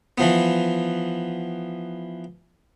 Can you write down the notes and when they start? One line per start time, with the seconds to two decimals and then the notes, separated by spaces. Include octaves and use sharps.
0.18 E3 F3 B3